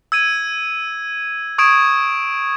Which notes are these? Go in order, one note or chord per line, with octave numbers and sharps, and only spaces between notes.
E6 G#6 D#7
C#6 D#6 G#6 D7 E7